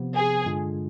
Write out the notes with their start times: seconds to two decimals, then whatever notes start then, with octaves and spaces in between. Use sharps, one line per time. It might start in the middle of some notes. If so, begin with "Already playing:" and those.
Already playing: C3 F3 B3
0.16 G#4
0.46 G2 D3 G#3 D4 F4